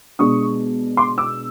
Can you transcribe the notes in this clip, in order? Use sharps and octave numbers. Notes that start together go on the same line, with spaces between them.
B2 G#3 B3 D4 C#6 D#6
C6 D6
D6 E6